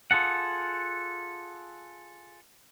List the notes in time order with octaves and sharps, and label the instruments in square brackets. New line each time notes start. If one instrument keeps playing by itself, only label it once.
[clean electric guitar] F4 G#4 A4 F#5